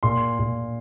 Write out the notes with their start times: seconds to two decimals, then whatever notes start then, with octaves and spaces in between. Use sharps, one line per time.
0.03 A#2 C6
0.39 A#2